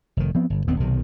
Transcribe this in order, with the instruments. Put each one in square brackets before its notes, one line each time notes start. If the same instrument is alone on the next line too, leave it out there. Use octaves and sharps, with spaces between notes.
[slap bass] F1 D#3
F3 B3 C4
G1
D#1 D#2 B3 C4
B1 C3 D#3